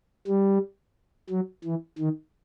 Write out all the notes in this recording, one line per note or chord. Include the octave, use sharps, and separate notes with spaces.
G3
F#3
E3
D#3